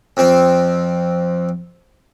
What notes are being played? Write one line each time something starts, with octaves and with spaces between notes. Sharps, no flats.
F2 C4